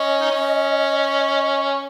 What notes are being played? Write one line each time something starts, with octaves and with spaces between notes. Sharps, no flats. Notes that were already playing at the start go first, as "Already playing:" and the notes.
Already playing: C#4 D#5
D#4
C#4